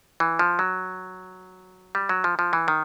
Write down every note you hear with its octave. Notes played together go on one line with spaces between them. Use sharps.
E3
F3
F#3
G3
F#3
F3
F3
E3
D#3